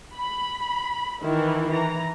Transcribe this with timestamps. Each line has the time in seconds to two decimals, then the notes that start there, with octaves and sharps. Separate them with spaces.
0.15 B5
1.23 D#3 E3 E4
1.70 E3 A#5